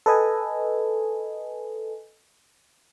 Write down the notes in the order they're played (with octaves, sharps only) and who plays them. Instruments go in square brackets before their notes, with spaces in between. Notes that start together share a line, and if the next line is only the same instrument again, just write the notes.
[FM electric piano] A4 B4 D#5 G#5